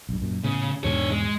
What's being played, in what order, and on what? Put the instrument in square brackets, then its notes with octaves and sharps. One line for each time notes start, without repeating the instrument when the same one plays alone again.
[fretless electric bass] B1 G2
F#2 A#2
[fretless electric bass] A2 B3 [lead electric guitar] C#3
[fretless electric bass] E2 G#2 B2 [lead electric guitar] D4 C#5
[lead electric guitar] G#3